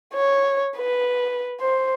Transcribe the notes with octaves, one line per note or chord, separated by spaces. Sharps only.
C#5
B4
C5